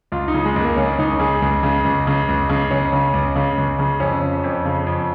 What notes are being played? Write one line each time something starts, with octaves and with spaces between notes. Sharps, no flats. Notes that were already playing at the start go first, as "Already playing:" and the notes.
C#2 F4
D#4
C#3
G#3
C#2 A#3
C#3 C#4
C#2 D#4
C#3 G#4
C#2
C#3
C#2
C#3
C#2
C#3
C#2 C#4
C#3
C#2
C#3
C#2
C#3
F2 C#4
C#3
F2
C#3
F2